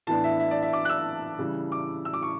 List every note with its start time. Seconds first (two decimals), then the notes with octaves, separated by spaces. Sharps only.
0.07 A2 E3 B3 D4 A5
0.24 E5
0.40 E5
0.51 D5
0.62 E5
0.73 D6
0.85 F#6
0.89 E6
1.39 C#3 E3 G3
1.72 D6
2.05 E6
2.14 D6
2.23 C#6